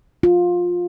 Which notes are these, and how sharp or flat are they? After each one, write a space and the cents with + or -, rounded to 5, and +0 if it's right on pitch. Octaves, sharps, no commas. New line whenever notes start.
F4 +15